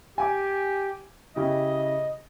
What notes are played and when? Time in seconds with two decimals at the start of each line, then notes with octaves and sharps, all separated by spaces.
0.18 G4 G#5 D6
1.36 C#3 E4 G4 D#5